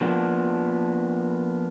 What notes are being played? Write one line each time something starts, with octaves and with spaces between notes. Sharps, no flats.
F3 A#3 B3 D4 F#4